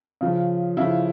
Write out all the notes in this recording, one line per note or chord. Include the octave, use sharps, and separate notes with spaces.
C#3 F3
C#3 F3 E4